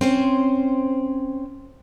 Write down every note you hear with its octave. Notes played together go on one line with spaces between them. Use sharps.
C4 C#4 C5